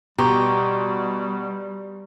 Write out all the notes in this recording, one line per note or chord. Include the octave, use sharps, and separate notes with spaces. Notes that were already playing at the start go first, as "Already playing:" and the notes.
B2 G3 G4 A#5 C6 C#6